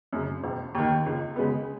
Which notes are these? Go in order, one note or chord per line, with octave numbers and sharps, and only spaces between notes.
F#2 C#3
E1
D#2 D#3
C#2
C#3 G#3 B3